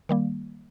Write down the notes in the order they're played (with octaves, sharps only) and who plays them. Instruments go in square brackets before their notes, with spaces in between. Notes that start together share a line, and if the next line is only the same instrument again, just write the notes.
[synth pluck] D#3 G3 A#3